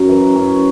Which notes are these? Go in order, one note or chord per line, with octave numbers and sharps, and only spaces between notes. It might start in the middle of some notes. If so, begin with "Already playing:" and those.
Already playing: F#2 A#4
E3
F#2 C#4